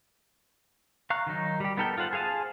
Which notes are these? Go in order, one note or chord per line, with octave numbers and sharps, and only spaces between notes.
F5 A#5 C#6 F#6
D#3 F#3 D#4
G3 G4
B3 D#4 A4 A#4 G5
F4 A4 C5 F#5
G#4 C5 F5 G#5 A5